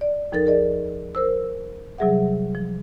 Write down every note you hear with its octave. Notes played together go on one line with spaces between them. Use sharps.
D5
D#2 F3 D#4 A4 A#4 A6
G#4 A#4 D5 D#5
A#4 C5 E6
C3 F#3 G3 G#4 E5 F#5
F3